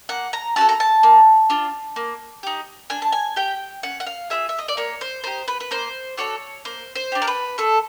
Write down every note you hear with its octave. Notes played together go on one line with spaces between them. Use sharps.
A#3 F#5
A#5
C#4 F#4 A4 A5
A#5
A5
A#3
D4 F4
A#3
D#4 G4
D4 G#5
A5
G#5
G4 G5
C#4 F#5
F#5
F5
F4 G#4 E5
E5
D#5
D5
A#3 C#5
C5
D#4 G4 C5
B4
B4
A#3 C5
D4 F#4 A4 C#5
A#3 C5
C5
D4 G4
A#4
B4
A3 A4